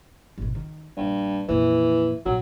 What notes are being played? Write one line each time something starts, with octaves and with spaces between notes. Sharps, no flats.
G#1 B2
D#3
A#1 G2
F2 A#2 E3
A#1 G#2 F#3